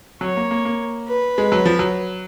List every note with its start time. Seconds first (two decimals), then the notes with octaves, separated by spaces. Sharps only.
0.21 F#3 C#5
0.37 A#3
0.51 A#3
0.65 A#3
1.09 B4
1.38 G#3
1.52 F#3
1.66 F3
1.79 F#3